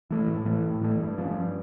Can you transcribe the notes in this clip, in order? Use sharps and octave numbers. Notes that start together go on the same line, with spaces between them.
E3 A3
A2
E3 A3
A2
E3 A3
G2
F3 A3 C#4
G2